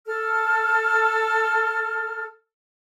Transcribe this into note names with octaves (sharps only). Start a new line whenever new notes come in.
A4 F6